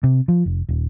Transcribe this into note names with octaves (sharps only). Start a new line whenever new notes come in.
C3
F3
F1
D#1